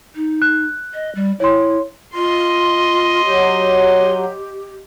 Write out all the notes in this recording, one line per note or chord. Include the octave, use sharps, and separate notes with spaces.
D#4
F#6
D#5
G3
E4 C#5 C6
F4 D#5 C6
F#3 G4